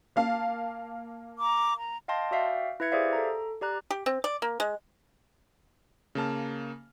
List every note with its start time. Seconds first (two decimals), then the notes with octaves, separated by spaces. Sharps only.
0.16 A#3 F5 A5
1.37 A#5 D6
1.79 A#5
2.08 D#5 F5 G5 A5 C6 A#6
2.31 F#4 D5 E5 F5 G5
2.80 E4 B4 E5 G#6 C#7
2.92 G4 G#4 C5 D5 E5 F5
3.13 A4 A#5
3.61 G4 D5 A#5 F#6
3.90 G4
4.06 C4
4.24 D5
4.42 A#3
4.60 G#3
6.15 C#3 A#3 A5 F6